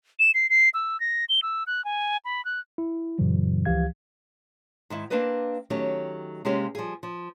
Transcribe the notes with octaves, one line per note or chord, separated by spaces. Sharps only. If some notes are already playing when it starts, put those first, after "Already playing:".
E7
C7
C7
E6
A#6
G7
E6
F#6
G#5
B5
F#6
E4
F#2 A#2 C#3 E3 F#3
C#2 E3 F3 G4 F5 G#6
G#2 D#3 E4
A#3 C4 D4 A#4 B4 D#5
D#3 F#3 A3 C#4 G4
C3 G#3 A#3 C4 C#4 G4
F3 G3 G#4
F3